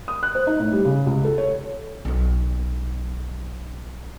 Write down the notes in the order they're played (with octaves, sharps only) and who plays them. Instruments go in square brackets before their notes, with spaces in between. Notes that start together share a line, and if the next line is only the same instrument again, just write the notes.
[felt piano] D#6
F#6
C5
D#4
A2
G3
C#3
C#2
A4
C#5
[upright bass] B1 F#3